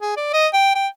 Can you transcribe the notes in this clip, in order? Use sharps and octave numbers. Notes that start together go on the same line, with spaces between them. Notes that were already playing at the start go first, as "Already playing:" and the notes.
G#4
D5
D#5
G5
G5